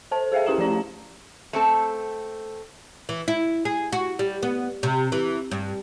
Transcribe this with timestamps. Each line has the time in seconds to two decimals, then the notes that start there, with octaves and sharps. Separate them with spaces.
0.11 A4 C5 A5
0.32 G#4 C5 E5 F5 G5
0.46 C#4 E4 G4 F5 A#5 E7
0.58 F3 A3 D5 A#5
1.53 A3 C4 A4
3.09 E3
3.28 E4
3.65 G#4
3.92 F#4
4.19 G3
4.43 B3
4.83 C3
5.12 E3
5.51 G2